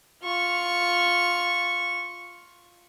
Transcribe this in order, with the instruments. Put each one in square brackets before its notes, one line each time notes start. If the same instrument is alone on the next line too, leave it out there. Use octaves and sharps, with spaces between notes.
[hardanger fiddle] F4 C#6